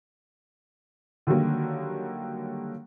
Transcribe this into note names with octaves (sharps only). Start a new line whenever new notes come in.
D3 D#3 F#3 G3 A#3